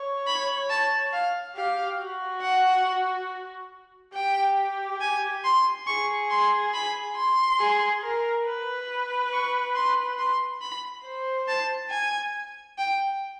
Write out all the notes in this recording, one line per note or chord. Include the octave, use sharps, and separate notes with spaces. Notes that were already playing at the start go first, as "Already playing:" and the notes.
Already playing: C#5
B5
A5
F5
G4 F5
F#4
F#5
G4 G5
G#5
C6
G#4 C#6
C6
B5
C6
G#4
A#4
B4
C#6
C6
C6
B5
C5
A5
G#5
G5